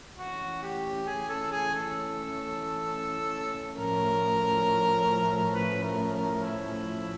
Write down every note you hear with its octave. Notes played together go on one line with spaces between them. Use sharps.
E3 A3 C#4 F#4
G4
G#4
A4
G#4
A4
A2 F3 A3 C#4 A#4
B4
A#4
A#4
E4